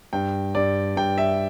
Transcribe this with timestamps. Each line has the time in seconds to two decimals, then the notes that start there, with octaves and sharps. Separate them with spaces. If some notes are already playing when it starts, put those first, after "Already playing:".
0.13 G2 G5
0.55 G2 D5
0.96 G2 G5
1.18 E5